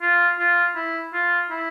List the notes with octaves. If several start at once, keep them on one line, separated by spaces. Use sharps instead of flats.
F4
F4
E4
F4
E4